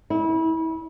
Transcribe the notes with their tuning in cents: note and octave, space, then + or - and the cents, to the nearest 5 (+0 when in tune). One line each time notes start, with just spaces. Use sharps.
E4 -30